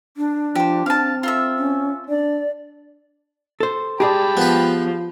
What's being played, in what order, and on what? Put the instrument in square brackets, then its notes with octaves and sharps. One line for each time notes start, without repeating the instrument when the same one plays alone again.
[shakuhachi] D4
[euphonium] F3 [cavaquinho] G4 C5
[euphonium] C4 [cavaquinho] F5 A5
[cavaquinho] F4 A4 E5
[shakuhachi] C#4
[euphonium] D4 [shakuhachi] D5
[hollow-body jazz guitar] A4 C5
[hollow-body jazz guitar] G4 G#4 D5 [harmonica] G5 A5 B5
[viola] F3 [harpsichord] B3 B4